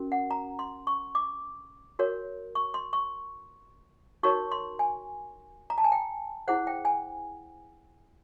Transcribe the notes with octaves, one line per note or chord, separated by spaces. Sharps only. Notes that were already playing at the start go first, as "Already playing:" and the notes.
Already playing: C#4 F#4 A#4
F#5
A#5
C6
C#6
D6
F#4 A#4 C#5
C#6
C6
C#6
D#4 F#4 A#4 C#5 C#6
C6
G#5
A#5
A5
G#5
G5
E4 G#4 C5 F#5
G5
G#5